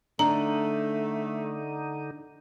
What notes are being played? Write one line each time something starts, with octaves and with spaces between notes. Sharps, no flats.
D3 A3 D4 D#4 A#5